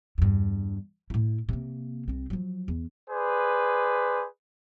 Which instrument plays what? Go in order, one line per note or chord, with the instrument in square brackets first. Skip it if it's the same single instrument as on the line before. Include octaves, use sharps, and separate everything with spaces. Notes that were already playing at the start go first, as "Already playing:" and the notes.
[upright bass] E2 G2
A2 E4
C3 A#3
C2 C4
F3 F#3
E2
[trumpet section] G#4 B4 C5 D5